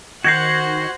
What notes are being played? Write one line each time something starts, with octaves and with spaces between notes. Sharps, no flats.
D#3 F#4 C5 F#5 G6 G#6 A#6 C7